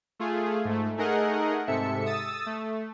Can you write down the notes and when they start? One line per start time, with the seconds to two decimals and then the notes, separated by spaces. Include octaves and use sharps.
0.20 A3 F4 G#4
0.65 G#2 A3
0.98 A3 D#4 G#4 A#4 D#5 F#5
1.67 G#2 C3 A4 E5 C#7
2.06 D#6 E6 A6
2.46 A3